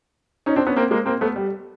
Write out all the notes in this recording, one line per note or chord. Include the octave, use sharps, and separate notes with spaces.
C#4 D#4
C4 D4
B3 C#4
A#3 C4
G#3 A#3
A#3 C4
A3 B3
G3